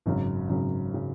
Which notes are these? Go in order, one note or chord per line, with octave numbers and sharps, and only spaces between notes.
G#1 F#2 C#3 F#3
G#1 F#2 C#3 F#3
C#3 F#3